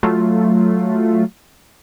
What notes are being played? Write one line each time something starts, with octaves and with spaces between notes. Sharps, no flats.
F#3 A3 F4